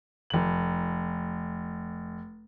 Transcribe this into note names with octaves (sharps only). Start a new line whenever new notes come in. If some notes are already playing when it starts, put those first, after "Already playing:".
F1 F#7